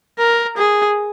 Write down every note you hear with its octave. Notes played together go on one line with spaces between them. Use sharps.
A#4
G#4